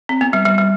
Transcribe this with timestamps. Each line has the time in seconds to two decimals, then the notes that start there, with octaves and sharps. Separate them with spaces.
0.09 C4
0.21 B3
0.33 G3
0.45 G3
0.58 G3